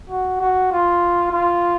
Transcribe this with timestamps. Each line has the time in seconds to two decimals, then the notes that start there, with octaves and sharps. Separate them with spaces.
0.10 F#4
0.41 F#4
0.72 F4
1.32 F4